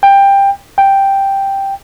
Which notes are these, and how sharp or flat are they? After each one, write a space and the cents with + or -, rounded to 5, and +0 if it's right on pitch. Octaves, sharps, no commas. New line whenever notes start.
G5 +15
G5 +0